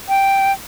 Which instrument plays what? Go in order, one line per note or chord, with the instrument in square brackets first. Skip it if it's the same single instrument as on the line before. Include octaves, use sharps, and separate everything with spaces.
[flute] G5